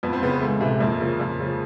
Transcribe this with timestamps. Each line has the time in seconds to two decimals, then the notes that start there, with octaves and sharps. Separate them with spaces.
0.03 F2 B3
0.13 C4
0.22 C#3 E3 B3
0.41 C#2 A3
0.61 C3 E3
0.80 F2 A#3
1.00 C#3 F3
1.20 F2
1.40 C#3 F3